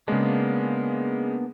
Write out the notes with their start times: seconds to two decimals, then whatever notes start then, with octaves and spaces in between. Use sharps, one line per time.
0.08 C#3 G#3 A#3 B3 D4